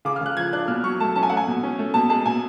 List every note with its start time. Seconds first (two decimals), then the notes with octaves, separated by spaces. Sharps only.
0.05 C#3 D6
0.16 F6
0.21 C#3 F#6
0.37 F3 G#6
0.53 D4 F#6
0.68 B2 F6
0.83 F#3 C#6
1.00 A3 A5
1.16 C#4 A5
1.23 G#5
1.29 A3 F#5
1.37 G#5
1.47 B2
1.63 C#4
1.79 A3
1.94 B2 A5
2.10 G#3 A5
2.25 B2 G#5